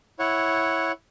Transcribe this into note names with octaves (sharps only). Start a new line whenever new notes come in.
E4 C#5 F#5